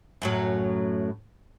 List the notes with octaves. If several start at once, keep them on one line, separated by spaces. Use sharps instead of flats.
F#2 A2 F#3